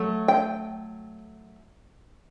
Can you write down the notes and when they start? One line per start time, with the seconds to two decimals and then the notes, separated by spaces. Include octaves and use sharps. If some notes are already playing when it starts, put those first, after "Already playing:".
Already playing: F#3 A3
0.28 G5